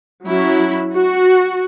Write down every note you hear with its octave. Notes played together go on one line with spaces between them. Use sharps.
F#3 C#4 E4
F#4